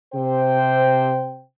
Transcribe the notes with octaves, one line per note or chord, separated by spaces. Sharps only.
C3 C5 G5